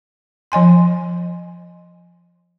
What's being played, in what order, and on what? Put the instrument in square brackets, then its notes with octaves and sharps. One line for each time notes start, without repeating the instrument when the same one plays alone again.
[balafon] F3 D#5 G#5 C6